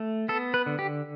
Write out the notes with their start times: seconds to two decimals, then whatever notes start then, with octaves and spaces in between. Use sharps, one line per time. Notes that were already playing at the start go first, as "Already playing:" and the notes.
Already playing: A3
0.29 B3 A4
0.54 B4
0.66 D3
0.79 G4